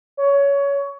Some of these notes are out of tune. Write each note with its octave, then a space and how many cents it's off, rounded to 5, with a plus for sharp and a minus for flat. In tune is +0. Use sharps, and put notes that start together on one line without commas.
C#5 +20